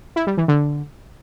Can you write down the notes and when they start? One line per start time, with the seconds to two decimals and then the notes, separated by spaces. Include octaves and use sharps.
0.16 E4
0.27 G3
0.37 E3
0.48 D3